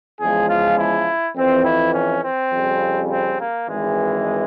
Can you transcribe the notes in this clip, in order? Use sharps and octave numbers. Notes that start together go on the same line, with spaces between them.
E2 C#3 F3 G#3 G#4
F4
E4
F2 C3 E3 C4
E4
C#4
C4
F2 C#3 G3
C4
A#3
G#1 G2 E3 G#3